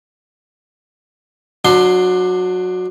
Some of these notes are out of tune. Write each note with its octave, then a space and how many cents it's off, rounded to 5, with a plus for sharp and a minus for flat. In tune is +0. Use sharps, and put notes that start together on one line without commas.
F#3 -20 D4 +20 C6 +0